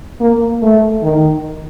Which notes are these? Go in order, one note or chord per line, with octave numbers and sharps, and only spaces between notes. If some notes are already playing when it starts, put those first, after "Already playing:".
A#3
A3
D#3